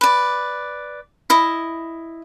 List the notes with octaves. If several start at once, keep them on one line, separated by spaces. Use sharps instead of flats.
B4 D5
E4 D#5